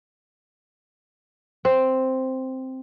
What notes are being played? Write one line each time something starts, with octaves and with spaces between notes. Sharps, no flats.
C4